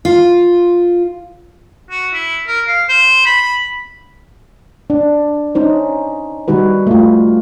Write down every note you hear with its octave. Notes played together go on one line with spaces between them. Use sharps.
F4
F#4
E4
A#4
F5
C5
B5
D4
C#4 D#4 C5
D#3 G3 D#4 F#4 B4
A3 F4